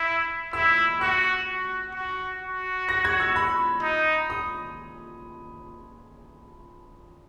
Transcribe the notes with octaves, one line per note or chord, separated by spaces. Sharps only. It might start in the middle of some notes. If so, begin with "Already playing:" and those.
Already playing: E4
E4 E6
F#4 F#6
F#4
F#4
F#4
A#6
G#6
E6
B5
D#4
D#6